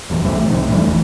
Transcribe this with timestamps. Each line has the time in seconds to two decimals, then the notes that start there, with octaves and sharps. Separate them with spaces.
0.10 E1 A1 E2
0.22 C2 G2 F3 A3
0.37 A#1
0.50 C2 A2 C3 D#3
0.71 E2 E3 G3 A3
0.85 D1 G1 E2